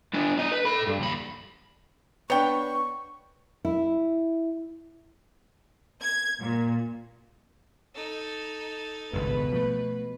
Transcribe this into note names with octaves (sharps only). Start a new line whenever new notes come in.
B3 D4
D4 D#5
B4
A4 B5
G2
D#2 B5
B3 D4 C#5 G5 C#6
E4
G#6
A#2
D#4 A4
G#1 C#2 G2 B2 B4
F3 G3 A3